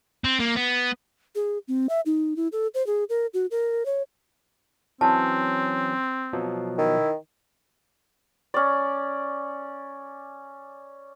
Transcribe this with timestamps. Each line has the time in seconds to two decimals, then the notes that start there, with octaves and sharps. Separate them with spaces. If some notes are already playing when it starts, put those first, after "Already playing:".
0.24 C4
0.40 A#3
0.56 B3
1.35 G#4
1.68 C4
1.89 E5
2.06 D#4
2.36 E4
2.52 A4
2.74 C5
2.87 G#4
3.09 A#4
3.34 F#4
3.51 A#4
3.86 C#5
5.01 E3 F#3 C4 C#4 A5
6.33 B2 F3 F#3
6.78 D#3 E4
8.54 C#4 D5